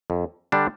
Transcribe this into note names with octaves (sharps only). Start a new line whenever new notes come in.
F2
D3 G3 D4